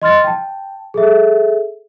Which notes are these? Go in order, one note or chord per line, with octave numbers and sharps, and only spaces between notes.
D#5 C6 F6 A6
G5 A5
G#4 A4 E5